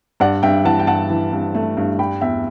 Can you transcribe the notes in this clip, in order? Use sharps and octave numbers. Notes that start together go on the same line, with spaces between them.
G2 D5 F#5
G2 E5 G5
E3 F#5 A5
G5
G2 F#5 A5
E3
G2
A3
G2
G3 G5 B5
E2 E5 G5